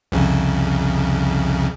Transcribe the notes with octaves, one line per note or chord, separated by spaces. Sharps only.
C2 F2 C#3